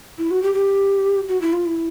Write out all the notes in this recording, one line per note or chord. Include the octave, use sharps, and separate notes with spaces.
E4
F#4
G4
G4
F#4
E4
F4
E4